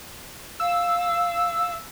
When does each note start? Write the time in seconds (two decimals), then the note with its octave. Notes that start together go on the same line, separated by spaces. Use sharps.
0.60 F5 E6